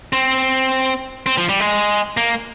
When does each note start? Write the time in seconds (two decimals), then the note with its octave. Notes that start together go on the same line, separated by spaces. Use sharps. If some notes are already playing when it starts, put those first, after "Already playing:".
0.13 C4
1.26 C4
1.37 F3
1.49 G3
1.60 G#3
2.17 A#3